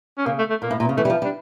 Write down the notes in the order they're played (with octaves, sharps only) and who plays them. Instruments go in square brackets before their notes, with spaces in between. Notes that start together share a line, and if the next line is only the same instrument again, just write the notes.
[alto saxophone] C#4
[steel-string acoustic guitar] C#3 [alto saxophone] A#3
[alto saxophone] A3
A3
[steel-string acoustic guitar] A#2 [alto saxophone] A#3
[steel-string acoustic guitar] A2
A#2
C#3
[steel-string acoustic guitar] E3 [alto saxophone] A3
[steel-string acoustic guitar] G3
F3
G3
[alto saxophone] D4